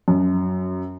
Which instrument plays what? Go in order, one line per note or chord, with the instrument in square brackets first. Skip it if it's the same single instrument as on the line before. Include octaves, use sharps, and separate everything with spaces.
[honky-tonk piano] F#2